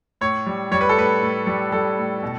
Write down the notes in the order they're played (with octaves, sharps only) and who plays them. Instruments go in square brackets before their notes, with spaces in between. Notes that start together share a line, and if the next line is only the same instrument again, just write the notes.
[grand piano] A2 C#5
G3
G3 C#5
B4
A4
A2 B4
A2
G3
G3 A4
A2
B2